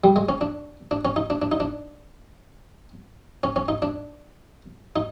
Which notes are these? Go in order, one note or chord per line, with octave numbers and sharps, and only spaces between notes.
G3
G#3
C#4
D4
D4
C#4
D#4
D4
D4
D#4
D4
C#4
C#4
D#4
D4
D#4